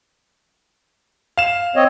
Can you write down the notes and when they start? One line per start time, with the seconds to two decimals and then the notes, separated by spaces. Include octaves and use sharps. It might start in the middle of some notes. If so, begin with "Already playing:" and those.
1.38 F5 E7
1.76 C4 C#5 D#5